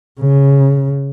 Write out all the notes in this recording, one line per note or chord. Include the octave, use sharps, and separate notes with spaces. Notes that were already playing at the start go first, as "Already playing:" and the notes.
C#3